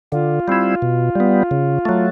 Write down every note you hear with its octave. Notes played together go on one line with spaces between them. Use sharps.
D3 F4
G3 C4 E4
B2
G3 B3
C#3
F#3 A3